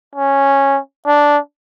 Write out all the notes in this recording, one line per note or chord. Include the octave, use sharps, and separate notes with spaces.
C#4
D4